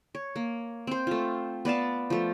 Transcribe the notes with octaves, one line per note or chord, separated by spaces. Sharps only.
C#5
A#3
C4 C5
A3 F4
B3 D5 F5 A5
F3 A3